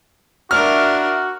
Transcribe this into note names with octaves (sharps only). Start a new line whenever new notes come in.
D4 E4 F#4 A#4 E5 F6